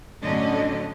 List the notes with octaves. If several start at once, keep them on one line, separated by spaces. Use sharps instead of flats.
A2 D3 F#3 C#4 D4 D#5